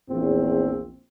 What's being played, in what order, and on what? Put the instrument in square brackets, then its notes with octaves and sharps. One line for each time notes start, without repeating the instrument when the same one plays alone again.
[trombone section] A#1 E2 C4